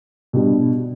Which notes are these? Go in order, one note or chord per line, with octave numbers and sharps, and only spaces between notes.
B2 G3 D4